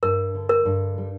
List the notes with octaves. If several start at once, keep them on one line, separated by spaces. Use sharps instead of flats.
G2 A#4
D3
A#4
G2
G3